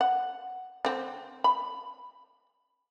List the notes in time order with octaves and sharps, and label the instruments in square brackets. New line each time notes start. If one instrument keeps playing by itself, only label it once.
[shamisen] F#5
D3 C4
B5